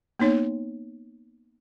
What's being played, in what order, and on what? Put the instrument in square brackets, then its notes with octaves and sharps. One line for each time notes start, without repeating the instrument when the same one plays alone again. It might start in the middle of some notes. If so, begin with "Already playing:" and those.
[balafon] A#3 B3 D#4 C#5